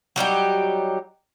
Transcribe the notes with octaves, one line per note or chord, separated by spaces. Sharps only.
F#3 G3 D#4 G4